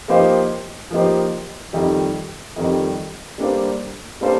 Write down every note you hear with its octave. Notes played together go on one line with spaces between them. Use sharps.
F3 A#3 D#4 G4 C5
F3 A#3 D#4 G4 C5
F2 D#3 G3
F2 D#3 G3
G3 A#3 D4 A4 C5
G3 A#3 D4 A4 C5